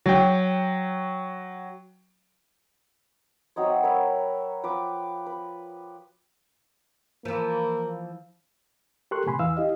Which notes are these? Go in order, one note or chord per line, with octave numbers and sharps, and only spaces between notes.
F#3 G5
F#3 C4 D#4 C#5
A#4 B4 C#5 E5
F3 B4 G5 D6
B4
E3 F3 A#3
G4 A4 A#4 C6 C#6 F#6
A2 C3 G#5 B5 C6
E2 E3 F5 E6
E4 G4 D#5 F5